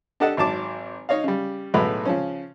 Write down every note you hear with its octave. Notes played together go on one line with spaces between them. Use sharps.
D4 G4 A4 D#5 F#5 A5
G#1 F#3 A5 D6
D#4 C#5 D#5 F5
C#3 G3
B1 A2 G#3 F#4 B4
C#3 F3 C#4